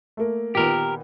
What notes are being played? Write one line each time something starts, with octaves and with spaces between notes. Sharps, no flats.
A3 A#3
A#2 D#3 B3 G4 A#4